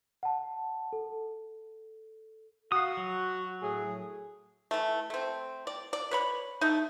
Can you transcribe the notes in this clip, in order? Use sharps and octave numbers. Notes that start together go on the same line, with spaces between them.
F#5 A5
A4
F#4 F5 D#6
F#3
A2 G#4
E3 A3
A3 C4
D5
D5
B4 C#5 B5
A3 D#4